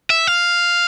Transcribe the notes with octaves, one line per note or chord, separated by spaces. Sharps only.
E5
F5